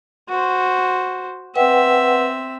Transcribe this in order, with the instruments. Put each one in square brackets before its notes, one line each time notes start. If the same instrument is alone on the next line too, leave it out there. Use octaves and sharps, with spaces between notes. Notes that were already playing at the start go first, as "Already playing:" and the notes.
[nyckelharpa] F#4 C5
[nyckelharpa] C4 E5 [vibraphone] B4 F#5 G5